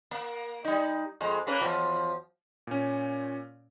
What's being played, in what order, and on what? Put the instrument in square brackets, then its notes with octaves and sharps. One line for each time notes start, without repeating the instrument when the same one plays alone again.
[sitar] A#3
G3 D#4
F2 G#3
A#3 C#4 B4
E2 F3 F#3
[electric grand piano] A#2 C#4